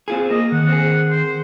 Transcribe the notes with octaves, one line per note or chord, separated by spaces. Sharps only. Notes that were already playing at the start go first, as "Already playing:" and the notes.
C4 F4 G#4
A#3 D#5
D#3 F#5
C4 G#4
C5